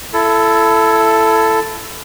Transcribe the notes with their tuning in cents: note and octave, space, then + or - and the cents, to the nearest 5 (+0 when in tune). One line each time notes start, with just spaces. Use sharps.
E4 +25 A4 +0